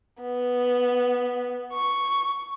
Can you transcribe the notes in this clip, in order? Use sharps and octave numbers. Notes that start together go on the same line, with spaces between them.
B3
C#6